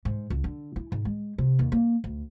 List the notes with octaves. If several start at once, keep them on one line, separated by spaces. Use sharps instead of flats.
G#2
C#2
D3
E4
G#2
G#3
C3
D#2
A#3
D2